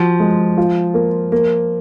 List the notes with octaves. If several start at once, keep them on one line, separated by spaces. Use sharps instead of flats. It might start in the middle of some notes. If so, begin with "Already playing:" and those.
Already playing: F3 F#4
G#3
F4
A#3
A#3